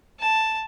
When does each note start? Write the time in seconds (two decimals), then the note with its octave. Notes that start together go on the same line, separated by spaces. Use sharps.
0.20 A5